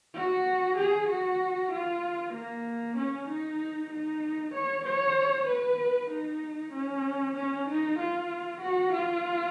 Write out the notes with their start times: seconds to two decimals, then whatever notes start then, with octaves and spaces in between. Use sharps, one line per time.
0.15 F#4
0.77 G#4
1.08 F#4
1.71 F4
2.34 A#3
2.97 C#4
3.28 D#4
3.91 D#4
4.54 C#5
4.85 C#5
5.47 B4
6.10 D#4
6.73 C#4
7.36 C#4
7.68 D#4
7.99 F4
8.61 F#4
8.93 F4